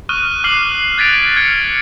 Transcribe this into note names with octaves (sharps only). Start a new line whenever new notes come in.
C#6 D#6 F6 F#6 D#7 G7
D6 F6 F#6 C7 F#7
F#6 G#6 A6 B6 D7 F7
F6 F#6 G#6 C#7 D7